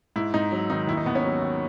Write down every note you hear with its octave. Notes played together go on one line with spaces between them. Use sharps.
G#2 E4
G#2 D#4
F#3
D#3 D#4
D#2 E4
D#4
D#2 B3
C#4
F#3
D#3